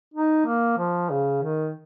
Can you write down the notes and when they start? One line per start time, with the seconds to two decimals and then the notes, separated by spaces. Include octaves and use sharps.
0.14 D#4
0.46 A#3
0.78 F3
1.10 C#3
1.42 D#3